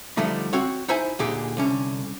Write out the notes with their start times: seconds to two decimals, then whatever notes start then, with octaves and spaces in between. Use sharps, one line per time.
0.17 D3 F3 G3 A3 D#4
0.53 C4 F#4 C#5
0.88 D#4 E4 C5 G#5
1.19 D2 A#2 D3 D#4 G4 G#4
1.57 C2 D3 C#4